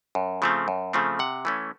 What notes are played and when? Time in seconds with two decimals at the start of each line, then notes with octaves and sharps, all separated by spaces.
0.15 F#2
0.42 C#3 F3 A3 C4
0.68 F#2
0.93 C#3 F3 A3 C4
1.19 C3 F#5
1.45 E3 A3 C#4